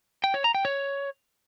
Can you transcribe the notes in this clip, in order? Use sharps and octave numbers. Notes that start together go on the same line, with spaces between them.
G5
C#5
A#5
G5
C#5